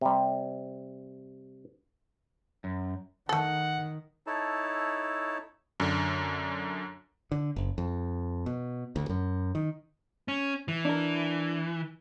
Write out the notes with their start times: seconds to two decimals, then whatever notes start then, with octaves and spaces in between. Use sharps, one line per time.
0.01 C3 G3
2.64 F#2
3.29 D#3 A3 A4 F#5
4.27 D#4 E4 A4 C#5 A5
5.80 F#2 D3
7.32 D3
7.56 F#1
7.78 F2
8.46 B2
8.96 D2
9.09 F#2
9.55 D#3
10.28 C#4
10.68 E3
10.85 D4 A#4